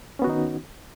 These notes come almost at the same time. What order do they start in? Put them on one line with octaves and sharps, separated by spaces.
C#4 B3 F#4 D#3 D#4